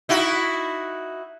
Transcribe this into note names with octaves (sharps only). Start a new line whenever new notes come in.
D#4 E4 F#4